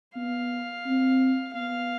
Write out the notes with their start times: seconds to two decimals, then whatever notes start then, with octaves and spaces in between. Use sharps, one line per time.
0.16 B3 F5
0.86 C4
1.55 B3 F5